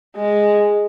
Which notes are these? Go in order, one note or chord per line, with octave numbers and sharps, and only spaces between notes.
G#3